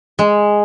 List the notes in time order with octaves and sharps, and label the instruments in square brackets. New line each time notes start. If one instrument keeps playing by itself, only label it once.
[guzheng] G#3